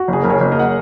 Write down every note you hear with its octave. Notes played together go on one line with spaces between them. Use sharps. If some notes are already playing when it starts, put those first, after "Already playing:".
Already playing: F#4
F#1 G#4
F#1 A#4
G#4 C#5
F#1
A#4 D#5
F#5